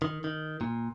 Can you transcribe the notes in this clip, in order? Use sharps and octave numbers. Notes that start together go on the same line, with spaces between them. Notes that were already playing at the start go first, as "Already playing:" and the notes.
D#3
D#3
A#2